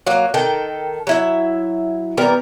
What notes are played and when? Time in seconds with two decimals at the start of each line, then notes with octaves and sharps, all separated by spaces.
0.06 F#3 A#3
0.34 D#3 A4 G5
1.07 F#3 E4 E5
2.17 E3 G3 B3 A#4